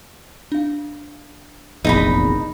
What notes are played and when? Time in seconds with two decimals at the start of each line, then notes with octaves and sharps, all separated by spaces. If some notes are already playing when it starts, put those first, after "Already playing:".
0.52 D4 F5
1.85 F1 A#1 E2 D#4 A#5 B5